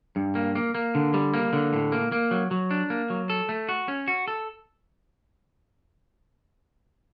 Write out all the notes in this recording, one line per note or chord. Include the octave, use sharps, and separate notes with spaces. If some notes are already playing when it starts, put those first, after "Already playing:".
G2
A#3
A#3
A#3
D3
G3
A#3
D3
A2
A#3
A#3
F#3
F#3
D4
A#3
F#3
A4
A3
F#4
C#4
F#4
A4